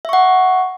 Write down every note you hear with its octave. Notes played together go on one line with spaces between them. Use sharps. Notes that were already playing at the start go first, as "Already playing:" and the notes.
E5 F#5 C#6